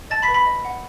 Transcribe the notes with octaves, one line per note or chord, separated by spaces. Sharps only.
D#5 A5 A6
B5 B6
B4
B5 B6
D#5
F#5